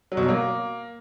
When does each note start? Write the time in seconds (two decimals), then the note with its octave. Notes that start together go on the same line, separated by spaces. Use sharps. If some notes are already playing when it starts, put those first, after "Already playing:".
0.12 F#3
0.17 B2
0.23 F#3
0.28 A#3